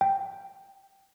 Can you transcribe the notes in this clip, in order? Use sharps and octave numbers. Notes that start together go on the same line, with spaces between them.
G5